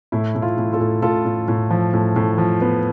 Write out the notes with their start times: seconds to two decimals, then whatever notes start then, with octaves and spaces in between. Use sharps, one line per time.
0.12 A2 E4
0.35 A2
0.42 F4
0.57 A2
0.72 F4 A4
0.80 A2
1.02 A2 F4 A4
1.25 A2
1.48 A2
1.70 F3
1.94 A2
2.16 A2
2.38 F3
2.61 B3